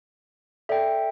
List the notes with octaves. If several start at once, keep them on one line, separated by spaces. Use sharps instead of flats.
A4 D5 E5 G5